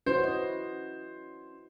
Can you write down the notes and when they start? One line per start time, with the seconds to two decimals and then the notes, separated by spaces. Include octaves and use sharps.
0.06 C#4 E4 F#4 B4 C5
0.23 D#5